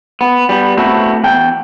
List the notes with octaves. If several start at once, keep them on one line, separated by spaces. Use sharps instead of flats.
B3
G3 B3
A3 B3 C4 E4 F#4
E2 G5